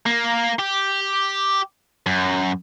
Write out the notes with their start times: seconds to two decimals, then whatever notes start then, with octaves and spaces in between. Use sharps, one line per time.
0.06 A#3
0.59 G4
2.06 F#2